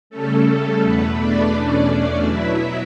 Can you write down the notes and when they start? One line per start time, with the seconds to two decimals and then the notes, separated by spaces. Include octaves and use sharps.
0.10 C#3 G3 A3 C#4 A4
0.81 E2 B2 A3 B3 B4
1.18 D4 D5
1.53 E2 B2 A3 C#4
2.24 B2 F#3 B3 E4 E5